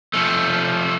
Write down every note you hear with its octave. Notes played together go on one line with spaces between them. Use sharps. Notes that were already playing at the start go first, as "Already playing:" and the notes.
F3 A3